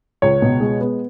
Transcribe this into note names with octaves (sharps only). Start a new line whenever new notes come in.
C#2 C#5
B2
G#3
B3